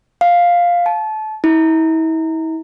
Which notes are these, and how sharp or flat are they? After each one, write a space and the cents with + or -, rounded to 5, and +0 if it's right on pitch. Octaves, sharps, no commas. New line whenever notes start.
F5 +5
A5 -25
E4 -40